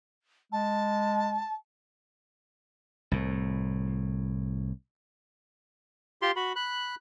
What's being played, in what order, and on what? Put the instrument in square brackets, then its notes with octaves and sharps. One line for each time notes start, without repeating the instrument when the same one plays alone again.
[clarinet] G#3 [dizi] A5
[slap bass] C2 A2
[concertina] F4 G4 C6
F#4 B5
B5 F#6